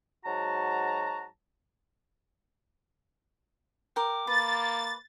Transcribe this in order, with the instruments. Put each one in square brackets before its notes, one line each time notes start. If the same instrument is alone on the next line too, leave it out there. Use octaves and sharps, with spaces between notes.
[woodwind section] G#2 F#3 F#4 A5 A#5
[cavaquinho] A#4 G5 [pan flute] D6
[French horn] A#3 [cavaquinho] B4 [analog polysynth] A6